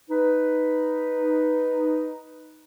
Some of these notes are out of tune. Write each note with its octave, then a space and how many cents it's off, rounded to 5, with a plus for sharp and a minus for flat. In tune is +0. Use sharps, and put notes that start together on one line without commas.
D#4 +0 B4 +0